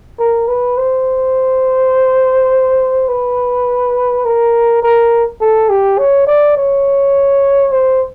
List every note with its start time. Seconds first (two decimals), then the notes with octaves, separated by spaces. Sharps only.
0.19 A#4
0.48 B4
0.78 C5
3.09 B4
4.25 A#4
4.83 A#4
5.41 A4
5.70 G4
5.99 C#5
6.27 D5
6.57 C#5
7.72 C5